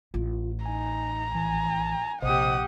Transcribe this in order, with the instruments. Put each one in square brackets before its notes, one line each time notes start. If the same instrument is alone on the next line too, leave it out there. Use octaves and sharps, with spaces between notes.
[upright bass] A1 [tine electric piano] F4
[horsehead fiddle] D#4 [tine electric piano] G#5 [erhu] A#5
[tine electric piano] A#1 E3 [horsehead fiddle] G#5
[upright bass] A#1 [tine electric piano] C3 C5 D#5 [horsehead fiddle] G4 F#5 [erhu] D#6